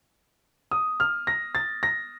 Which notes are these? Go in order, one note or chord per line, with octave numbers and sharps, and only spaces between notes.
D#6
F6
A#6
A6
A#6